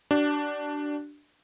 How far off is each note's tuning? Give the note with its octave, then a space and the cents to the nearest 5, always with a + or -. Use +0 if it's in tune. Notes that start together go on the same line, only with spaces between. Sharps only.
D4 +0 G4 -45